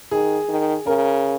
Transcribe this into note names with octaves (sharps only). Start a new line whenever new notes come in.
D#3 G#4
D#3
C#3 A#4